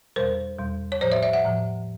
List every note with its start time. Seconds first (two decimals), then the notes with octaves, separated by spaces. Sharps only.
0.16 E2 B2 G3 A#4 C5
0.59 E2 B2 G3
0.92 C#5
1.01 A2 F3 C5 D5
1.12 D5 E5
1.23 D5 E5
1.33 E5 F#5
1.45 A2 F3